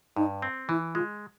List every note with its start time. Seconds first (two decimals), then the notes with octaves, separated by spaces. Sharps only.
0.16 G2 D#4
0.42 C4
0.69 E3 E4
0.95 G#3 F4